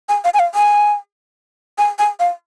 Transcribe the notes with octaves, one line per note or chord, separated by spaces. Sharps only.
G#5
F5
G#5
F5
G#5
G#5
G#5
F5